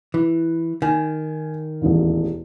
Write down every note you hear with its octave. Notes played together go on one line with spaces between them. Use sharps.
E3
D#3 G#5
E1 A1 D#2